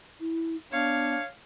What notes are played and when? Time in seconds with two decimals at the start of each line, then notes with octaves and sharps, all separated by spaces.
0.20 E4
0.73 B3 D4 C#5 F5